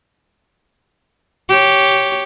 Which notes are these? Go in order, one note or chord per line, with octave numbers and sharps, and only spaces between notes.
G4 C#5